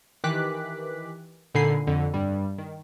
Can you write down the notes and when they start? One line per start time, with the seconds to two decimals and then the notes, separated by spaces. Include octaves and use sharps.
0.24 D#3 E3 G4 D6 F#6 B6
1.55 A#2 D3 D#4 G#5 B5 C7
1.87 F2 D3
2.14 G2 G3
2.58 D#3